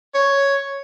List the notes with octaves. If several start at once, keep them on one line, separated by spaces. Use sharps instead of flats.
C#5